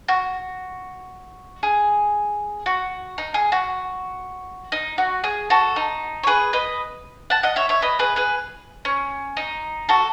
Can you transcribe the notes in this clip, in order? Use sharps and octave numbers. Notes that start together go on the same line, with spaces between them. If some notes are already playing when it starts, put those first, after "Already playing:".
F#4
G#4
F#4
D#4
G#4
F#4
D#4
F#4
G#4
F#4 A4
D#4
C#5
G#4 B4
B4 D#5
F#5 A5
D#5 F#5
C#5 E5
C#5 E5
B4 D#5
G#4 B4
G#4 B4
C#4
D#4
F#4 A4